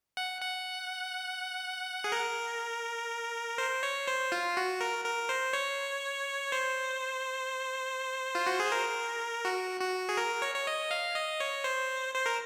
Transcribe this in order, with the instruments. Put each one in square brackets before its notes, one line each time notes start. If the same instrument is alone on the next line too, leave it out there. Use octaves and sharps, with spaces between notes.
[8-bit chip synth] F#5
F#5
G#4
A#4
C5
C#5
C5
F4
F#4
A#4
A#4
C5
C#5
C5
F4
F#4
G#4
A#4
F#4
F#4
G#4
A#4
C#5
C#5
D#5
F5
D#5
C#5
C5
C5
A#4